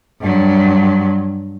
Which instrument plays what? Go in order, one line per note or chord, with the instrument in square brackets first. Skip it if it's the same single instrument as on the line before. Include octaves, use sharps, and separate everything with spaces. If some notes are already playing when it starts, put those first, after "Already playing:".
[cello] G2 F#3